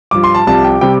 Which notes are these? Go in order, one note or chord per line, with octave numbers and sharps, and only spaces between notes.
G2 F3 D6
C6
A5
C2 C3 F3 A5
G5
C3 G3 G5